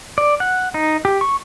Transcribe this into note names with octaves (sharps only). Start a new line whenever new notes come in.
D5
F#5
D#4
G4
C#6